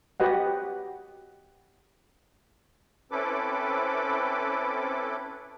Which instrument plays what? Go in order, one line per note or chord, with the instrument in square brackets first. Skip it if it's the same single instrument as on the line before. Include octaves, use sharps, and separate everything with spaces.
[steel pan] F#4 G4 B4 D#5 F#5
[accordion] C4 C#4 E4 A4 B4 D6